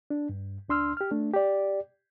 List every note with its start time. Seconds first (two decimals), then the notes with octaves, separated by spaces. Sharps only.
0.10 D4
0.29 G2
0.69 C#2 D4 C6 E6 F6
0.97 G4 F6
1.11 A3 D4
1.34 G4 D5